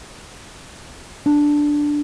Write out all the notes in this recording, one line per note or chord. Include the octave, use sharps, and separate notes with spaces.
D4